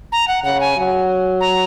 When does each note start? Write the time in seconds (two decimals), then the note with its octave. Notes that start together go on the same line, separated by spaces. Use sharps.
0.12 A#5
0.28 F#5
0.44 C#3 F#5
0.60 G#5
0.77 F#3
1.41 A#5